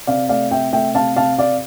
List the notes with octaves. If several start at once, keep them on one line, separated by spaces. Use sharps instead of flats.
C3 D5 F5
A3 D5 F5
C3 E5 G5
A3 E5 G5
C3 F5 A5
C3 F5 A5
C3 D5 F5